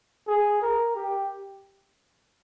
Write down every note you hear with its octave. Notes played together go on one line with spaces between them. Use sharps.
G#4
A#4
G4